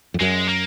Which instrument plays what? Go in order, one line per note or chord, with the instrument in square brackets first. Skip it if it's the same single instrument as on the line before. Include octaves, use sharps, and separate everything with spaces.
[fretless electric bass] F2
[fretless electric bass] F#2 [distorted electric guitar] G#3
[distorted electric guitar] A#3